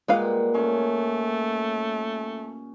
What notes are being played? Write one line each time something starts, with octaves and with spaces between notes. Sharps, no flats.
A#2 G3 G#3 B4 F5 F#5
A3 C#4